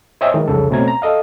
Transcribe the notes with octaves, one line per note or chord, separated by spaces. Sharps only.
C5 C#5 D#5 E5 G5 G#5
D#3 E3 G#3
C2 F2 C#3 A4
B2 A3 C4 C#4 A#5 G#6
A#5
A4 D#5 F5